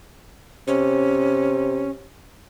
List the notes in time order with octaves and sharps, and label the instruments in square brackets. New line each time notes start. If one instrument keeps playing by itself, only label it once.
[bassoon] C3 [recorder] C#4